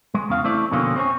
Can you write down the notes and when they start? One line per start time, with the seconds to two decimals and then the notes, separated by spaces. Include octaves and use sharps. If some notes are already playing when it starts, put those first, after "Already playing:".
0.14 G#3
0.29 E2 C#3 F5
0.44 A3 C4 E4 D5
0.71 F2 B2 D3 A#3 C#4 F4
0.95 C4 C#4 E4 C#5